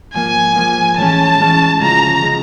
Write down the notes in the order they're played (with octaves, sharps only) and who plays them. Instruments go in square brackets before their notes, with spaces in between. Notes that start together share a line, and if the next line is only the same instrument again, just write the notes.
[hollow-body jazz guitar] G#2 F3 A#3 [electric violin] G#5
[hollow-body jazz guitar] G#2 F3 A#3
[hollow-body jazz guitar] A2 E3 G#3 C#4 [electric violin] A5
[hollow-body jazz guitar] A2 E3 G#3 C#4
[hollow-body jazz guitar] D2 C#3 F3 G#3 [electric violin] A#5
[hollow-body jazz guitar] C#3 F3 G#3